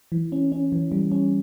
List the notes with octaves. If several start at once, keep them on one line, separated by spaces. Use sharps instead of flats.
E3
C#4
C#4
E3
G3
C#4